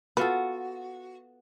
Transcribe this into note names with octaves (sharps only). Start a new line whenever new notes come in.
B3 F4 F#4 A4 B4